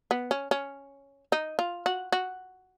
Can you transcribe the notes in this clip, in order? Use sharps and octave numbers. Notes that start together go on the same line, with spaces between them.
B3
C#4
C#4
D#4
F4
F#4
F#4